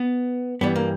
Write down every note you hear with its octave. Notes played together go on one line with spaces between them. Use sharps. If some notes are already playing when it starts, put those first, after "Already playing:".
Already playing: B3
G2 E3 G3 B3
A#3